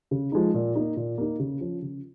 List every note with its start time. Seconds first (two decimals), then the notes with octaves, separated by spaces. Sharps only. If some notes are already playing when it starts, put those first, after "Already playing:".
0.11 C#3
0.32 F3 G#3 D#4
0.54 A#2
0.76 A#3 D#4
0.97 A#2
1.18 A#3 D#4
1.40 C#3
1.61 F3 C#4
1.82 C#3